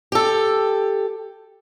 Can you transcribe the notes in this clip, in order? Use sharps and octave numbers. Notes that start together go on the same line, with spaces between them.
G4 A4